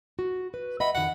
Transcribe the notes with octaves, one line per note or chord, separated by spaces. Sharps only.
F#4
B4
D#5 E5 F#5 B5
F2 D#3 F#5